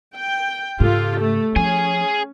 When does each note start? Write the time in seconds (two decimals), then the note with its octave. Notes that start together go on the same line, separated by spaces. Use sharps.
0.16 G5
0.80 G#2 C#3 F4 G4 A4
1.20 A3
1.56 F3 C#4 G#4 G#5